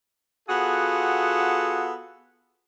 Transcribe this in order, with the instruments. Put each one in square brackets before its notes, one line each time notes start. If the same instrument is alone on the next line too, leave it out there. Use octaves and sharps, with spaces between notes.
[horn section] B3 F4 F#4 G#4 A4